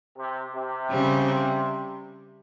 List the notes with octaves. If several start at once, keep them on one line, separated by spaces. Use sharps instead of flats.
C3
C3
C#3 G3 C4